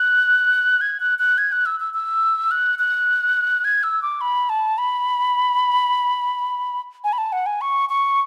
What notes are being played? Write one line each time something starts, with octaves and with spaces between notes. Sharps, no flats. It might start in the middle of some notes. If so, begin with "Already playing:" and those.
Already playing: F#6
G#6
F#6
F#6
G#6
F#6
E6
E6
E6
F#6
F#6
G#6
E6
D6
B5
A5
B5
G#5
B5
A5
F#5
G#5
C#6
C#6